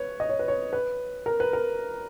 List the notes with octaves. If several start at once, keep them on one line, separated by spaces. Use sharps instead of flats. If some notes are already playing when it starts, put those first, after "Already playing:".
Already playing: B4 C#5
D#5
C#5
B4
C#5
B4
A#4
B4
A#4